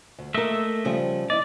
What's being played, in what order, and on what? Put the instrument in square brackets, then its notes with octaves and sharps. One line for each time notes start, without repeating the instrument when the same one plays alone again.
[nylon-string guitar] D2
[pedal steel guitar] A3 D#5 E5 [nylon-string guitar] A#3 A#4
[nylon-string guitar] C#3 F3 G3
[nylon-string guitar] E4 D#5 [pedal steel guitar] D5